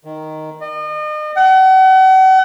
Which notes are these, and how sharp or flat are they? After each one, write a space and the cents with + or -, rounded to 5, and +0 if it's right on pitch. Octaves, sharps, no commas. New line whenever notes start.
D#3 +0
D#5 -40
F#5 +40